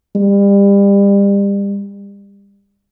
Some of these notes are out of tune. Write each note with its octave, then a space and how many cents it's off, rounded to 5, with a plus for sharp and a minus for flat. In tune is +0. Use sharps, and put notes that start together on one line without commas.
G3 +30